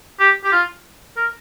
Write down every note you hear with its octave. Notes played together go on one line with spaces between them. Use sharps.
G4
G4
F4
A#4